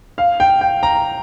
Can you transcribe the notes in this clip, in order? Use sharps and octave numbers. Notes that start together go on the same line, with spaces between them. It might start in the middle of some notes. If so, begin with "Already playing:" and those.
F5
G5
G5
A#5